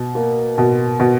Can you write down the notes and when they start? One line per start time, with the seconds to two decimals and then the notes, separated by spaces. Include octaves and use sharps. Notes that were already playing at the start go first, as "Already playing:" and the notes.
Already playing: B2
0.15 A#3
0.58 B2
1.00 B2